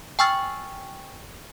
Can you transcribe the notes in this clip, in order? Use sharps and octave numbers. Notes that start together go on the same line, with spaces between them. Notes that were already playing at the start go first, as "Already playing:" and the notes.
G5 G#5 C#6 E6 F6 A6